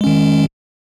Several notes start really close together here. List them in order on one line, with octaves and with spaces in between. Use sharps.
G#3 C#4 D#3